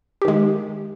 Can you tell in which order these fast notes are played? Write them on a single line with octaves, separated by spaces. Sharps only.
G4 D#3 G#3